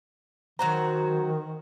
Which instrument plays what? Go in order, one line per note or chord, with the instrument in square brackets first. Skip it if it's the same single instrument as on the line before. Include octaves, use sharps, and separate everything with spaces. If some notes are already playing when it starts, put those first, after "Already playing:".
[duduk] D#3 [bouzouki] F#3 F#4 C5 [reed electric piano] A#5